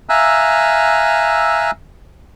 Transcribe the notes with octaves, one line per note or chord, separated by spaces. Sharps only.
E5 F5 G#5 A#5 E6 F#6